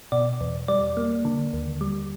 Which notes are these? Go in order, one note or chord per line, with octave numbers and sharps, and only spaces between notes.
B2 D5
E2
G3 D5
A#3
D3
D#2
G3